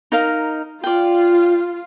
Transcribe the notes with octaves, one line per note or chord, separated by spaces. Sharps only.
D#4 A#4 F5
F4 D5 G5